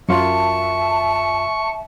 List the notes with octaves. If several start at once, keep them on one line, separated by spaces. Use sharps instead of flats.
F#2 F4 E5 A5 C#6